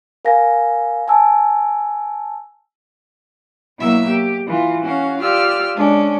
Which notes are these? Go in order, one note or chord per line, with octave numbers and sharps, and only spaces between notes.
A#4 F5 G#5 A#6
G#5 A5 E6
B2 F#3 A#3 E4 E5 E6
G4
E3 F4
C#4 F#4 F5
F4 G4 D5 E6 F6
G#3 C#4 D4